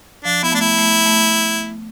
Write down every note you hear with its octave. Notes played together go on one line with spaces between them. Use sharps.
F3 D4
B3 E4
A3 D4
E4
A3
A3